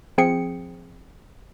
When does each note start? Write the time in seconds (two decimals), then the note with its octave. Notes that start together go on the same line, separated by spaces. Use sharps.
0.18 F3 C4 G#4 G5 C#7